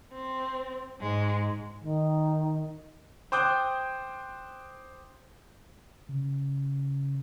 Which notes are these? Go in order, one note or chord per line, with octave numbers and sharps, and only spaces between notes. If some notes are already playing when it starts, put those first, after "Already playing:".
C4
G#2 G#3
D#3
C5 G5 D6 D#6 F#6 G6
C#3